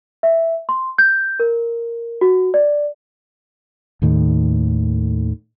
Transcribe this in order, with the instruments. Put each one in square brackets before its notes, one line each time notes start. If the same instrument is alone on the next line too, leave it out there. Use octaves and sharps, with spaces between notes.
[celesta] E5
C6
G6
A#4
F#4
D5
[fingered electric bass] D#2 A2 D#3